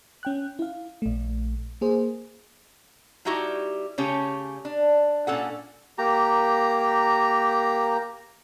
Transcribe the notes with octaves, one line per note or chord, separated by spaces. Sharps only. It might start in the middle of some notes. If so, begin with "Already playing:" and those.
C#4 G5 F#6
E4 F5
A#1 A3
A#3 G#4 C5
G3 D#4 E4 F#4 G4
C#3 A3 C#4 G4 C#5
D4
A#2 C#4 A4 F#5
A#3 G4 A#5